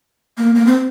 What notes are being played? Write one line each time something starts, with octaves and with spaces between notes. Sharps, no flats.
A#3
A#3
C4